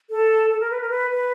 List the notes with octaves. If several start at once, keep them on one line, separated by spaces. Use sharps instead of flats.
A4
A4
A#4
B4
A#4
B4
B4